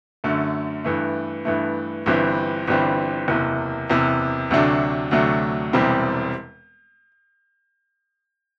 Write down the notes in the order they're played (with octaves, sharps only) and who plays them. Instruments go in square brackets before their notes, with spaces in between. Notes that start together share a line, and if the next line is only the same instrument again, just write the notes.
[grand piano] F#2 D3 A3
G2 E3 A3
G2 E3 A3
G1 G2 E3 G3 C4
G1 G2 E3 G3 C4
F#1 E2 C3
F#1 E2 C3
D2 C3 F#3 A3 D4
D2 C3 F#3 A3 D4
E1 E2 C3 G3 C4